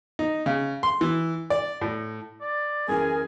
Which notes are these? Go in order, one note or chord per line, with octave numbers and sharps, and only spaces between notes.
D#4
C#3
C6
E3
D5
A2
D5
F#2 E3 G#4 A#4 G#5